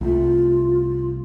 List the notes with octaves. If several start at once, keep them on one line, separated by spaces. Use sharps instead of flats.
C2 A3 F4